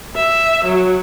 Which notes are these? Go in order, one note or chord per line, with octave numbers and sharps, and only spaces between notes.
E5
F#3